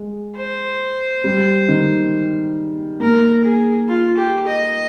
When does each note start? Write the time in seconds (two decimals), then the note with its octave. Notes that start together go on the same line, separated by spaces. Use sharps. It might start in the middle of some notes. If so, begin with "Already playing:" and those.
Already playing: G#3
0.36 C5
1.24 G3
1.68 D#3
3.00 A#3 A#4
3.44 G#4
3.88 F4
4.17 G4
4.47 D#5